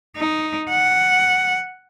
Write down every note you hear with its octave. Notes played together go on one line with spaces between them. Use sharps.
D#4
F#5